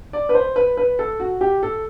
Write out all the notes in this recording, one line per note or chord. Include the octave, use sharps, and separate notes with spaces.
D5
B4
C5
B4
B4
A4
F#4
G4
A4